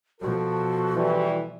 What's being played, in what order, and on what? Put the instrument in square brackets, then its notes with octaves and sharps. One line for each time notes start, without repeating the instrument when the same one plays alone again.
[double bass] B2 F3 [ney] F#4 [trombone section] A4
[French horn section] E3 G3 E4